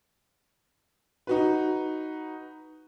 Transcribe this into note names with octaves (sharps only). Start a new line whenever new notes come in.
D#4 F#4 B4